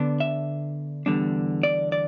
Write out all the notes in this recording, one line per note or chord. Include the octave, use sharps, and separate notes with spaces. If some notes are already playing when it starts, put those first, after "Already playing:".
Already playing: D3 B3 D4
E5
E2 D3 G3 D4
D5
D5